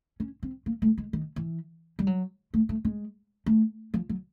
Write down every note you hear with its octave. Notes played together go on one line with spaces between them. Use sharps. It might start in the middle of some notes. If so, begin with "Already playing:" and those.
C#4
C4
A#3
A3
G#3
D#3
E3
G3
F#3
A3
A3
G#3
A3
F3
F#3